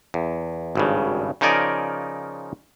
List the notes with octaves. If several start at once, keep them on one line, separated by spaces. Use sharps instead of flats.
E2
G#1 G2 C#3
C#3 F3 D#4 A#4 D5 G#5